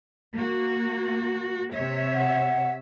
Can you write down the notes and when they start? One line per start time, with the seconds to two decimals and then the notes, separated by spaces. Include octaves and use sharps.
0.34 A#3 F#4
1.74 C3 C#5 E5
2.14 F#5